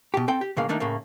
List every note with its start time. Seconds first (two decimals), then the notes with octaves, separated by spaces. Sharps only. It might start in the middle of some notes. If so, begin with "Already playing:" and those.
0.14 B2 G4
0.28 C4 A4 G5
0.41 G4
0.57 A2 C#3 G#3 A#3 F5
0.69 D#3 A3 A#3 D4 D#4
0.80 A2 C#3 A3 A#3